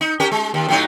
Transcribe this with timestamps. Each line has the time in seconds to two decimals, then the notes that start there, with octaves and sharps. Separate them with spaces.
0.01 D#4
0.20 C#4 G4 A#4
0.32 G#3
0.54 D#2
0.69 A2 F#3 D#4